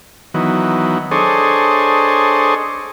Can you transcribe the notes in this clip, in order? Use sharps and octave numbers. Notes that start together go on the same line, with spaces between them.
D#3 E3 F#3 B3
D4 G#4 A4 C5 C#5 D#5